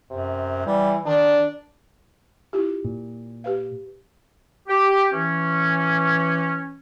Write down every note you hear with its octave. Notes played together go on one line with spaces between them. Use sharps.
F#2 C3
E3 G3
D#3 D4
E4 F4 G4
A#2
G4 B4 F5
G4
E3 C#4